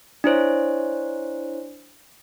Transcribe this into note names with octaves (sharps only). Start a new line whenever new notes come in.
D4 E4 C5 C#5